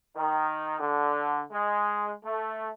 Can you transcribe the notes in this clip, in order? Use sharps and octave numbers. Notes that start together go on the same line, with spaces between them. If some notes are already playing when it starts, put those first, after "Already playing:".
D#3
D3
G#3
A3